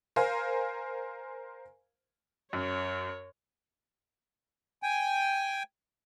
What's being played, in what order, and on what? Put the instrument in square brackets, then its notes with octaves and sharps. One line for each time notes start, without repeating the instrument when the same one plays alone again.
[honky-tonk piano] A#4 C5 F5 G#5
[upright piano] F#2 [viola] C#5
[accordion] G5 G#5